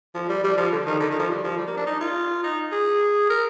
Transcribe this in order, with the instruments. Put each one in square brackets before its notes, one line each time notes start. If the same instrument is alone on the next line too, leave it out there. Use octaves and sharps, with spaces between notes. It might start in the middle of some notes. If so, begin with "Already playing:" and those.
[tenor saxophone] F3
G3
G3
F3
D3
D#3
D3
D#3
F3
G3
F3
G3
A#3
D4
D#4
F4
D#4
G#4
A#4